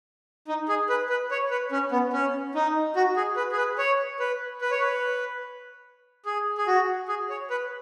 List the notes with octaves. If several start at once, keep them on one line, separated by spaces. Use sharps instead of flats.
D#4
G#4
B4
B4
C#5
B4
C#4
B3
C#4
D#4
F#4
G#4
B4
G#4
B4
C#5
B4
B4
C#5
B4
G#4
G#4
F#4
G#4
C#5
B4